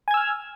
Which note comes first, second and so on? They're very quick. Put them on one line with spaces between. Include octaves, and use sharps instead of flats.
G#5 G#6 E6 F6